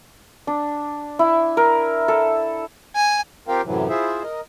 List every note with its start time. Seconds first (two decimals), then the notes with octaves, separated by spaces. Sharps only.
0.47 D4
1.19 E4
1.57 A#4
2.08 A4
2.95 G#5
3.48 C4 F4 G4 A#4 F5 G5
3.65 F#2 A2 C3 E3 F#3
3.89 E4 F4 G#4 C5 E5
4.23 A#4 D#5